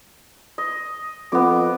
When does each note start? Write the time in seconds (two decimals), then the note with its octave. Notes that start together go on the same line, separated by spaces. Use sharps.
0.58 D#5
1.32 F2 B3 D6